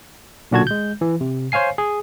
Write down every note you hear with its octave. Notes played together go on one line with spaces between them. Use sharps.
B1 A#2 D3 F#4 A5 G#6
G#3 G6
E3
C3
C5 C#5 F5 G#5 C7
G#4